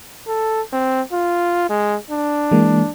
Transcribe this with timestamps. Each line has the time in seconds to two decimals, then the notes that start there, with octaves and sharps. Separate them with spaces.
0.27 A4
0.73 C4
1.12 F4
1.70 G#3
2.11 D4
2.51 E3 G#3 A#3